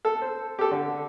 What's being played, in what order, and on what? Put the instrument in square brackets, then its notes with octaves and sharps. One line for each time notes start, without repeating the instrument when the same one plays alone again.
[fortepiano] A4
C5
G4 A4
D3